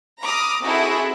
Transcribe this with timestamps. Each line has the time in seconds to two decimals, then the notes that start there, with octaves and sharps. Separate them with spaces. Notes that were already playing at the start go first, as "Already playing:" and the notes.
0.21 A#5 B5 D6 D#6 F6
0.64 C4 D#4 E4 F#4 G#4 A4